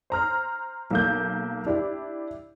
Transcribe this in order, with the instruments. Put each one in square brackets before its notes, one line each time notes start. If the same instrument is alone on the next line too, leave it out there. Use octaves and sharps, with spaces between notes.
[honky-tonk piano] C5 A#5 F6
B1 A#3 G6
D4 E4 G4